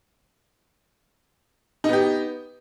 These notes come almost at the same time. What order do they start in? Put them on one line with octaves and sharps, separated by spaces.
D#4 B3 G4